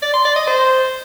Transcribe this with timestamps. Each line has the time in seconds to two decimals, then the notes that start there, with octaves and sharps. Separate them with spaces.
0.02 D5
0.14 C6
0.25 D5
0.36 D#5
0.47 C5